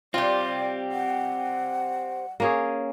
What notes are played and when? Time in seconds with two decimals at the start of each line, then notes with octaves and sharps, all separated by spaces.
0.14 G3 C4 F4 G4 D5
0.92 F#5
2.40 A#3 C#4 G#4